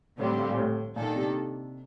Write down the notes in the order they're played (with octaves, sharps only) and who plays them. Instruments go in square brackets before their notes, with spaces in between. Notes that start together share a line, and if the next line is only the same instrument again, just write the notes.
[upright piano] A2 [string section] D3 G3 C4 G4
[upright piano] G2
A#2
A2
[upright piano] A#2 [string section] D#3 A#3 D4 A4
[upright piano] C3